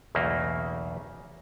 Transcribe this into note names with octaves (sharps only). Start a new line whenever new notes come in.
B1 E2 C#3 A3 A#3